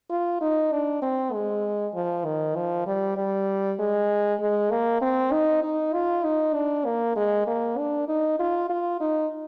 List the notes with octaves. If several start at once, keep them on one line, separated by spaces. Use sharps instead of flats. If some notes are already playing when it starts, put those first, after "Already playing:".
F4
D#4
D4
C4
G#3
F3
D#3
F3
G3
G3
G#3
G#3
A#3
C4
D#4
D#4
F4
D#4
D4
A#3
G#3
A#3
D4
D#4
F4
F4
D#4